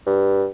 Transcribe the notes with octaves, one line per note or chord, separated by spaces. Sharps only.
G2